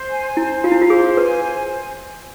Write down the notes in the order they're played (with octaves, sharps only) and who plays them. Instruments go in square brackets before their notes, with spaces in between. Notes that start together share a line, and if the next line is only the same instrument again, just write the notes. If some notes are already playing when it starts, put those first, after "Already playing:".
Already playing: [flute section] C5
G#5
[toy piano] E4 [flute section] C5
[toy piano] F4 [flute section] F5
[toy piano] E4
F4
[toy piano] G#4 [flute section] C5
[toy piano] B4 [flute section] G#5
[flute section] C5